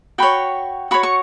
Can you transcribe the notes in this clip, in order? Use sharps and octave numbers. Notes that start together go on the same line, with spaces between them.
F#4 C#5 G5 B5
F#4 C#5 B5
C#6